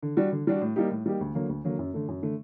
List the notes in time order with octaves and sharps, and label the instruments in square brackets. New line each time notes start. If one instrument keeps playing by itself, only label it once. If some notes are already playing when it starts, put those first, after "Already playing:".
[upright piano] D3
G3 D4 F#4
D3
G3 D4 F#4
A2
G3 A#3 D#4 G4
A2
G3 A#3 D#4 G4
D2
D3 F#3 A#3
D2
D3 F#3 A#3
F#2
D3 A3
F#2
D3 A3